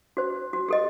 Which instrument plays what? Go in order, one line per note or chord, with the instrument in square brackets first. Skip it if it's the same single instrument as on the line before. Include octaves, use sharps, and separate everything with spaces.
[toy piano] F#4 C5
F#4
G4 A4 D#5